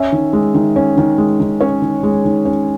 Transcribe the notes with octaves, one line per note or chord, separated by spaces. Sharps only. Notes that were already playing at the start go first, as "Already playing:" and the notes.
Already playing: C#4 E5
D#3
G#3
D#3
C#4
D#3
G#3
D#3
C#4 C#5
D#3
G#3
D#3
C#4